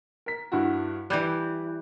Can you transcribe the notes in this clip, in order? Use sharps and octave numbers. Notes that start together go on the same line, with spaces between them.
A#4 B6
G2 E4 F#4
E3 G3 F#6 G6